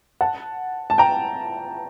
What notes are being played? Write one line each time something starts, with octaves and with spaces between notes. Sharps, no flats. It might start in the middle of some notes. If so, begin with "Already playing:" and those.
F#5 A5
A5
G5 A#5